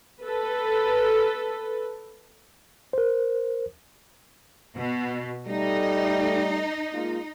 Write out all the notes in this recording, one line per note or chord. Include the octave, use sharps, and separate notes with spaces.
A4 B4
A#4 C5
B2
G3 A3 D#4
G#3 A#3 F4